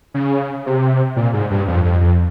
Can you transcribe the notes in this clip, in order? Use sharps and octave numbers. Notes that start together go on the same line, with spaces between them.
C#3
C3
A#2
G#2
G2
F2
F2
F2